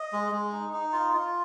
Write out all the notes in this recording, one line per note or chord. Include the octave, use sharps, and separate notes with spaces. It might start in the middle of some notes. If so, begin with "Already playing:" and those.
Already playing: D#5
G#3
G#3
D#4
D#4
F4
F4